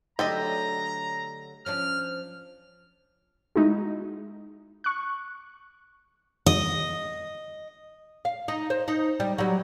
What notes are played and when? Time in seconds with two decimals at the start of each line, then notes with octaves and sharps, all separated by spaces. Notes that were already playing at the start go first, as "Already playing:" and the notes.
0.19 D3 F#3 A3 G4 A4 D#5 A#5
1.66 F3 C#4 D4 F6
3.56 G#3 D#4 E4 F#4
4.84 C#6 F#6
6.46 D#5
8.25 F5
8.48 D#4
8.70 C5
8.88 D#4
9.20 G3
9.38 F#3 G3